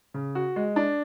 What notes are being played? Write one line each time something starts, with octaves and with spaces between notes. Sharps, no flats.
C#3
F#4
G#3
D4